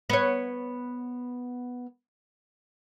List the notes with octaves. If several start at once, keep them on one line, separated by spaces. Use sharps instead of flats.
B3 C#5